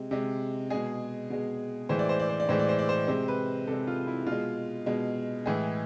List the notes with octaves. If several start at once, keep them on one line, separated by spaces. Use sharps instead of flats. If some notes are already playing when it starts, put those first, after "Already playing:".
Already playing: C3 G#3
C3 G#3
B2 G#3 G#4
B2 G#3
A2 E3 G#3 C5
D5
C5
D5
C5
D5
A2 E3 G#3 C5
D5
C5
D5
C5
C3 G#3 C5
B4
C3 G#3 A4
F4
E4
B2 F4
G#3
B2 G#3
A2 E3 G#3 G#4